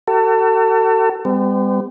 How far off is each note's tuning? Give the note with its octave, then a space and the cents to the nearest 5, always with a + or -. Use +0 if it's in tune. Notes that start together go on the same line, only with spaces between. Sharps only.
F#4 +40 A4 +35
G3 +35 C4 -45